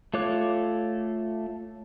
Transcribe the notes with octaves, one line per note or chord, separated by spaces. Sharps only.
A3 F4 C#5 D6 F#6